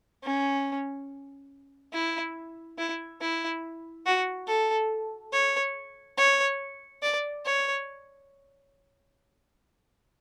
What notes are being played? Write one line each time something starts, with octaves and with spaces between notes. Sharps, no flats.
C#4
E4
E4
E4
F#4
A4
C#5
C#5
D5
C#5